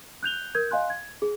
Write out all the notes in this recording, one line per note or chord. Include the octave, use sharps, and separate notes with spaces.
F#6 G6 F7 G7
A#4 G6 G#6
D#5 F5 G#5 C6 F#6
G#6
G#4